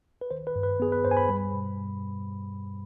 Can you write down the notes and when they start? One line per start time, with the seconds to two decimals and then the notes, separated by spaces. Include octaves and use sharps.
0.21 B4
0.31 D#3 C5
0.47 B4
0.56 G2
0.63 B4
0.80 B3 G#4
0.92 B4
1.05 G2 C5
1.11 G#5
1.17 B5
1.29 G3
1.53 B2